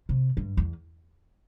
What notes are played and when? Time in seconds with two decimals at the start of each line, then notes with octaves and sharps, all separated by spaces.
0.09 C3
0.37 G2
0.57 E2